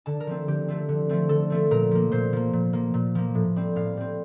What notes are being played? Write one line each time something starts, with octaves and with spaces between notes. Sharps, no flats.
D3 A5
A#4
F3 A3 C4
D3 G4
F3 A3 C4
D3
F3 A3 C4
D3 A4
F3 A3 C4
A#2 A#4
F3 A#3
A#2 C5
F3 A#3
A#2
F3 A#3
A#2
F3 A#3
A2
G3 C4
A2 F5
G3 C4